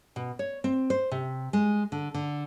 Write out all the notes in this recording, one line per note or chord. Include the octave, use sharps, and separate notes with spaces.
B2
C#5
C4
C5
C3
G#3
D3
D3